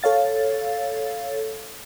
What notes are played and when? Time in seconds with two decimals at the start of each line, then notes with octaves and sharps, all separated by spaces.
0.03 A4 C#5 F5 A6